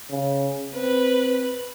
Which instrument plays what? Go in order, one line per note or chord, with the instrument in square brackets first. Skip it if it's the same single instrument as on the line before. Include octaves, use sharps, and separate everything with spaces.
[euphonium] C#3
[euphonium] C4 [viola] B4